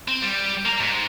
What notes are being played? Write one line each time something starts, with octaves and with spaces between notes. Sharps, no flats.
C4
G3
A#3 A#5
G#2